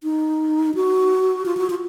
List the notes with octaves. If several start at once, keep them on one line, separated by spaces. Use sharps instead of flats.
D#4
F#4
F4
F#4
F4